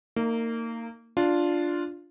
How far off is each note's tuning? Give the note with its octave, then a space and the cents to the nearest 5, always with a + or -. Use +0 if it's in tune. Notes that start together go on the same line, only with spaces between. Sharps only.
A#3 -25 D#4 +0
D4 +0 F4 +0